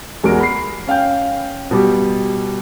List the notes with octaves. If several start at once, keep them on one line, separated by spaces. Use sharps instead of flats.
E2 G#3 F#4 A#4 D7
B5 C7
C#4 F5 G5 G6
B2 G3 G4